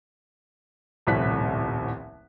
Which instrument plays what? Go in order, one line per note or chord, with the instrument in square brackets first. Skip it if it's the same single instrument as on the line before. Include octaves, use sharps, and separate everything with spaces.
[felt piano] D#1 C2 A2 F3 F#6 B6